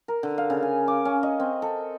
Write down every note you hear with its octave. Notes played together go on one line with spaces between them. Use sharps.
A#4
D3
F5
C#3
G#5
D6
C#4
D#5
C4
A4